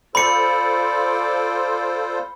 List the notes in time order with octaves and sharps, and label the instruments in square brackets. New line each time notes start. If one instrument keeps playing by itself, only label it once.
[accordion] F4 A4 C5 [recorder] D5 [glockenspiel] B5 C#7